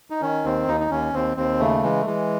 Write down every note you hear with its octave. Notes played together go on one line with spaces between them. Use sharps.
D#4
D#3 C#4
D#2 C4
D#2 D#4
D#4
D#2 C#4
D#2 C4
D#2 C4
C#3 A3
E3 G#3
A3
E3 G#3